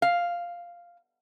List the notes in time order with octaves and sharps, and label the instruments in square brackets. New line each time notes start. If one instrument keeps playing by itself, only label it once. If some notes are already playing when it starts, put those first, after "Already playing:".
[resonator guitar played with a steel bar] F5